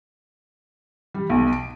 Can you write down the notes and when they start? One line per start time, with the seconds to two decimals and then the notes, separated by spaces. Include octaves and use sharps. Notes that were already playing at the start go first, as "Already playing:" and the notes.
1.14 G3
1.30 B1
1.53 D7